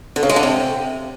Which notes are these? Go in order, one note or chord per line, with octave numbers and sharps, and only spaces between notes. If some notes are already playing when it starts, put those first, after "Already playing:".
D3
C#3
G#3
D3
C3